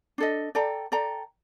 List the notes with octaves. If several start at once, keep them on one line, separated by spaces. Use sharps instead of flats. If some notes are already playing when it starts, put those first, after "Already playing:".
D4 A4 D#5
A4 D5 G5 A#5
A4 D5 G5 A#5